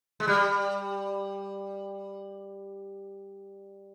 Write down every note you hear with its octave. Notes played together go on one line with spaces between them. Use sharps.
G#3
G3